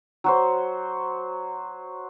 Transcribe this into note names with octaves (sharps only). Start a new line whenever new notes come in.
F#3 F#4 C5